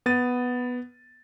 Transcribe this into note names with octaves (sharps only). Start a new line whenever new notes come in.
B3 A6 D#7